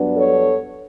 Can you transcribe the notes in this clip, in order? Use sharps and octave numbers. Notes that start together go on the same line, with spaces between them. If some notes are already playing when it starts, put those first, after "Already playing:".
Already playing: G2 F#3 B3 D4
A4 C#5